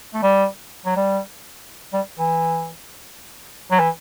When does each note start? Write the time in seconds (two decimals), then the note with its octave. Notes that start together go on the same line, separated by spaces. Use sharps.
0.14 A3
0.23 G3
0.86 F#3
0.96 G3
1.93 G3
2.19 E3
3.71 F#3
3.80 E3